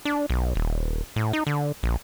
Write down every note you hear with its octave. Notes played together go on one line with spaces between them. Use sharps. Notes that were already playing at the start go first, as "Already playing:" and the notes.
D4
B1
D#1
A2
D#4
D3
A#1